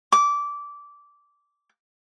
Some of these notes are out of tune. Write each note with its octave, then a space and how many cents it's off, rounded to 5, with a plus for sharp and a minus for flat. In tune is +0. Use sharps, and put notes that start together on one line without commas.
D6 -15